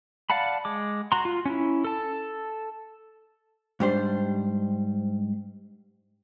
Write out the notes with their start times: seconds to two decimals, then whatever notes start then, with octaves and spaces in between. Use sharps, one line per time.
0.30 D5 F5 F#5 A5 B5
0.65 G#3 D6
1.12 F#4 A#5 C6
1.25 F4
1.46 C#4 E4
1.85 A4 A5
3.80 G#2 G3 D4 C5